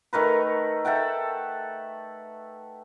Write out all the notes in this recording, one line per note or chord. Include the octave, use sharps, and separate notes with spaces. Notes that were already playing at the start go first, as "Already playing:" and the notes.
D#3 A3 A#4 B4
A4 E5 F#5 G5